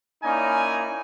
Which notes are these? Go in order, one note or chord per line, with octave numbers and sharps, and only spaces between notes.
A#3 C#4 D#4 E4 D5 G#5